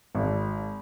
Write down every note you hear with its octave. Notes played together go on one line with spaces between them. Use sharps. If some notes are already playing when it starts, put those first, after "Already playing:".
G#1